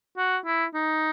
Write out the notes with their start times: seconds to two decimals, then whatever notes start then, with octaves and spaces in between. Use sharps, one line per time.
0.18 F#4
0.46 E4
0.74 D#4